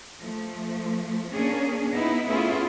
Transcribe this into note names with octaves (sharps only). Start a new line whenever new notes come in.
F3 A3
A#3 C#4 D4 G#4
B3 D#4 E4 B4
A3 B3 C#4 E4 F4 G#4